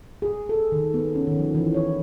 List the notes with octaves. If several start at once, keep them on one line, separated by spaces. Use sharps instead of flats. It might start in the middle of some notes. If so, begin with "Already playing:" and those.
G#4
A4
D#3
B3
C#4
D#3
F3
E3
C#5